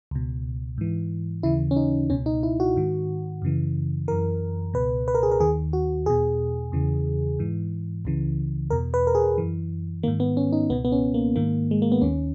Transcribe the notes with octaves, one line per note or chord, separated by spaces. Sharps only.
C#2 B2
G#2 E3
D#2 C#3 E3 E4
C#4
D#4
C#2 B2 C#4
D#4
E4
F#4
G#2 D#3
F#2 C#3 E3
F#2 E3 A#4
C#2 B2 B4
B4
A#4
G#4
A#4
D#2 D#3 G#4
F#4
E2 B2 G#4
E2 C#3 E3
G#2 E3
C#2 C#3 E3
E2 B2 A#4
B4
A#4
G#4
F#2 E3
G#2 D#3 A#3
B3
C#4
D#4
C#2 B2 B3
B3
C#4
A#3
G#2 D#3 A#3
G#3
A#3
B3
D#2 D#3 C#4